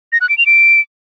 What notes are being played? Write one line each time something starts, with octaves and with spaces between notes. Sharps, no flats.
A#6
F#6
D7
F7
D7